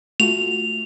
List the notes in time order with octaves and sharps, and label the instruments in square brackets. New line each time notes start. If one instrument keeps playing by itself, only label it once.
[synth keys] A3 F4 F#4 [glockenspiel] F7